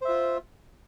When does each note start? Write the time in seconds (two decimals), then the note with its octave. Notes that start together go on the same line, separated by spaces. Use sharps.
0.01 C5
0.05 E5
0.08 F4